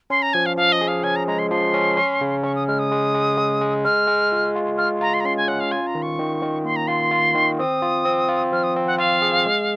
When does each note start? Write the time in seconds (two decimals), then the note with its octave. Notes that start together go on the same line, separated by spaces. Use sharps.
0.10 C#4 C6
0.22 A#5
0.33 F3 G#5
0.46 F5
0.57 F3 F5
0.72 D#5
0.81 G#4
0.88 F5
1.04 C#4 G#5
1.16 A#5
1.27 G#3 A#5
1.39 C6
1.50 F3 C6
1.74 C#4
1.97 C#4
2.21 C#3
2.44 C#4 C#6
2.55 D#6
2.68 G#3 F6
2.79 D#6
2.92 G#3
3.15 G#3
3.38 G#3
3.61 G#3
3.85 G#3 F6
4.07 G#3
4.32 F4
4.55 F4
4.78 F4 F6
5.01 F4 A#5
5.14 C6
5.20 A#5
5.25 C#4 C6
5.37 G#5
5.48 C#4 F#5
5.60 F5
5.71 F4 G#5
5.87 A#5
5.95 D#3
6.02 C#6
6.19 D#3
6.42 D#3
6.65 A#3 C6
6.76 A#5
6.87 F4 C6
7.11 F4
7.35 D#3
7.59 C4 D#6
7.82 F4
8.05 C4
8.29 F4
8.52 F3 F6
8.63 D#6
8.76 C4
8.87 F#5
8.98 F4 F5
9.22 G#4
9.46 G#3